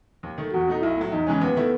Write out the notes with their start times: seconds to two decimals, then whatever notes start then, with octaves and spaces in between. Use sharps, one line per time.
0.23 D#2
0.38 D#3 A3
0.53 E2 F#4
0.67 B2 A3 D#4
0.82 B1 E4
0.97 A2 F#3
1.12 E2 D#4
1.27 C#3 E3 G#3 C#4
1.41 D#2 B3
1.56 D#3 A3 E4